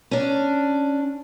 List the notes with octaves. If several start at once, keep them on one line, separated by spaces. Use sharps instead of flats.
C#4 D4